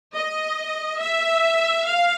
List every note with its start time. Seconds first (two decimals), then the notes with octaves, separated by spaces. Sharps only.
0.14 D#5
1.01 E5
1.87 F5